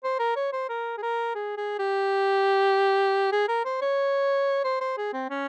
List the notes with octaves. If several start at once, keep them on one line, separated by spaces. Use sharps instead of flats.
C5
A#4
C#5
C5
A#4
G#4
A#4
G#4
G#4
G4
G#4
A#4
C5
C#5
C5
C5
G#4
C4
C#4